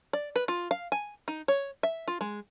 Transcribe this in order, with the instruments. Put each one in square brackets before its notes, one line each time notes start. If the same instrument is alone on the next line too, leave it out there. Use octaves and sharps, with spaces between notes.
[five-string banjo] D5
B4
F4
F5
G#5
D#4
C#5
E5
F4
G#3